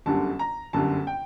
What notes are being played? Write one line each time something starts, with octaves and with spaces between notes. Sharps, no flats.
G1 F#2 D3 G3 A5
A#5
G1 F#2 D3 G3 A5
G5